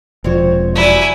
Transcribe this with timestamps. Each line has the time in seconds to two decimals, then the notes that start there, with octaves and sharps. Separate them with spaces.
0.24 E1 F3 C4 C#5
0.75 F#3 G3 E4 D5 G#5